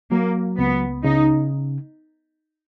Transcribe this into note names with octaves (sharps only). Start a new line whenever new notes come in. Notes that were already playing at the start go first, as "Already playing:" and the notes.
F#3 A#3
C#2 B3
C#3 D#4